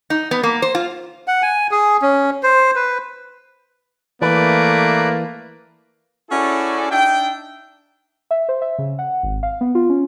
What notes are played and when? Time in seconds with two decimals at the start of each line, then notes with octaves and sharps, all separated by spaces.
0.10 D#4
0.31 B3
0.43 A#3
0.62 C5
0.75 F4
1.28 F#5
1.42 G#5
1.71 G#4
2.02 C#4
2.43 C5
2.76 B4
4.22 E3 A3 A#3 B4 D5
6.30 C#4 E4 F#4 G#4 A4 D5
6.90 D4 D#4 E5 G5
8.31 E5
8.49 C5
8.62 E5
8.79 C#3
8.99 F#5
9.23 G#1
9.43 F5
9.61 B3
9.75 F4
9.90 C#4